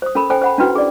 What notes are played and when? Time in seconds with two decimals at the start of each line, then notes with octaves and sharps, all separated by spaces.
0.02 C5 D#6
0.15 C#4 A4 A#4 B5
0.30 A4 C5 G5 G#5
0.42 C5 F#5 B5
0.58 C#4 D4 E4 F#4 B4 G5
0.75 G#4 D5